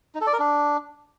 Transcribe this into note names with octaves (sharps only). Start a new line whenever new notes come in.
D#4
A4
D5
A#4
D4